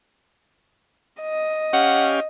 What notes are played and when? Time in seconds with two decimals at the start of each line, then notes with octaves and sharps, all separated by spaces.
1.21 D#5
1.73 C#4 G4 F5 F#5